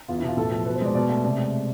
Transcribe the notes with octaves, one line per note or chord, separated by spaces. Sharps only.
E2 F4
E4
B2
F4
A2 A4
F3
B2 B4
C5
G#3 D5
B2 D5
A3
C3 D5
G#3